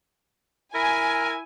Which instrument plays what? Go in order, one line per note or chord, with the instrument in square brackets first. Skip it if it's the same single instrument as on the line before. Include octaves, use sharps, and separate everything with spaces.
[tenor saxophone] E4 [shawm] A#4 [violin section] G#5